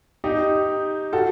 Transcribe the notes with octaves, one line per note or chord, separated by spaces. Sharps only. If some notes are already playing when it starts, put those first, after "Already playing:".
D#4 G4
F#4 A4